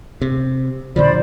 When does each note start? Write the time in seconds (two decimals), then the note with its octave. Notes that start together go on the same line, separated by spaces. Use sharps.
0.22 C3
0.96 A#2 D3 F3 C5 D5 B5